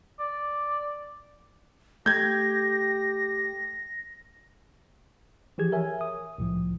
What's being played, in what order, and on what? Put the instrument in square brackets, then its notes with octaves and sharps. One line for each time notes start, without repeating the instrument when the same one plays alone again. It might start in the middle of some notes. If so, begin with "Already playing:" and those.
[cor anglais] D5
[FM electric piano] A3 [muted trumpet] G4 [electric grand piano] G6 G#6 [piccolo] A#6
[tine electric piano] E3 F3 G4 G#4 G#6
A#4 C#5 E5 G#5
D#6
C2 A2 F3